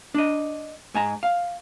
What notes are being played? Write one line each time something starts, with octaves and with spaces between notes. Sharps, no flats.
D4 D#5
G#2 G#5 A#5
F5